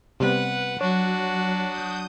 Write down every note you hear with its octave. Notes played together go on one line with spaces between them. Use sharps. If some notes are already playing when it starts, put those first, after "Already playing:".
C3 G3 B3 B4 F#5
F#3 D4 F#4 C#5
D#6 G6